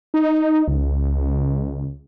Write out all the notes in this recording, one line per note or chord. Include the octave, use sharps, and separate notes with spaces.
D#4
C#2